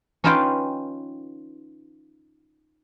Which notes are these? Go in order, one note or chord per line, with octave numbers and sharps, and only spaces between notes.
C#4 D#4 F4 B4 F5 G5